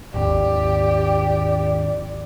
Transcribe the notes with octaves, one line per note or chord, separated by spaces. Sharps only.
G#1 D#2 G4 D5